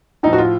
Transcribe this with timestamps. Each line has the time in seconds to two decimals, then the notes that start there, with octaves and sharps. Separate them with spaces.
0.23 A2 F3 D#4
0.33 F#4
0.38 F4